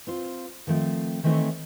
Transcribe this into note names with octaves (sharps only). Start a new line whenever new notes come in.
C4 F4 C5
D#3 F3 A3 C4
D#3 E3 A3 C4 D#4 C#5